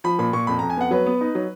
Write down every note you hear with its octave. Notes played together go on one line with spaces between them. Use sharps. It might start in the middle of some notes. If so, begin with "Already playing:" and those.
F3 B5
A#2 B5
A#2 C#6
F2 B5
A#5
F2
G#5
B3 F#5
F#3 B4
B3
D#4
F#3